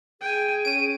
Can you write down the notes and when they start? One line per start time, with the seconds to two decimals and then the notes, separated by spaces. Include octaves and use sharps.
0.21 G#4 G5 G#5
0.65 C#4 D7 D#7